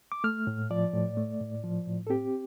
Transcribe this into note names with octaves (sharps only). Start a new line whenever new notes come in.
D6
A3 F6
A2
F3 D5
A2
A3
A2
F3
A2
A4
C4 G4